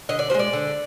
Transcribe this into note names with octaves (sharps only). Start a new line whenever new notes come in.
D3 D#5
D5
F3 C5
G#3 D5
D3